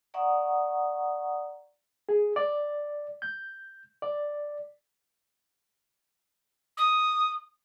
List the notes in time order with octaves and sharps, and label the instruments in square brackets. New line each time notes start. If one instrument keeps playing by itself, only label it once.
[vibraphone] D5 E5 F#5 A#5 C#6 D#6
[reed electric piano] G#4
D5
G6
D5
[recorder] D#6